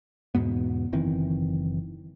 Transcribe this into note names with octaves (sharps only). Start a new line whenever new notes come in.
E2 G#2 B2 B3
F#1 D#3 E3 C4